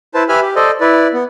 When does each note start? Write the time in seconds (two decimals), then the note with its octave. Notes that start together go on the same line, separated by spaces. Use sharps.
0.14 E4 B4 C5 A5
0.29 G4 B4 E5 G#5 B5 F6
0.42 G4
0.56 A4 C5 D5 D#5
0.81 E4 B4 D5
1.13 B3